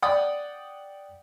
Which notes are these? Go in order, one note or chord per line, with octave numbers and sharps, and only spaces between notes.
D5 F#5 G5 D#6